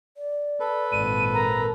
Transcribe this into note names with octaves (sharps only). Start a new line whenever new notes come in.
D5
A4 B4
G#1 A#2 D#7
A#4 A#5